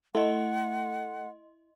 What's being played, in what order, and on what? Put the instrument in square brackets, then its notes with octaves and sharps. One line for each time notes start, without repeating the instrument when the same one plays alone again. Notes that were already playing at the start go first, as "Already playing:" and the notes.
[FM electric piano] A3 [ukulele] E4 [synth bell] D#5 C6 [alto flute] F#5